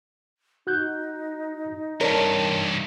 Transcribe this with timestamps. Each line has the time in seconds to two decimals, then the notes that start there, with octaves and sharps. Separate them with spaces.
0.67 D#4 F#4 F#6 G6
2.01 G2 C3 A#4 C#5 D5 A5